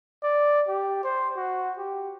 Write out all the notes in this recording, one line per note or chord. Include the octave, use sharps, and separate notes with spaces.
D5
G4
C5
F#4
G4